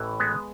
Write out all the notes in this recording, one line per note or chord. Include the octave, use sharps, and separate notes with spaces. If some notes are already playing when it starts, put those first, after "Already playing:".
Already playing: A1 A2 E3
G#3 B3